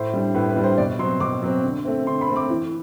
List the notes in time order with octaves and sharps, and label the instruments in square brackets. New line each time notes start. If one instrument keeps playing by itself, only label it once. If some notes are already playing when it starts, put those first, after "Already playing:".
Already playing: [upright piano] A2 C5
G3 D4
A2 B4
B4
G3 D4
C5
B2 D5
F#3 C6
C4
B2 D6
F#3 C4
D3
A3 C4
D3 C6
B5
A3 C4
D6
E3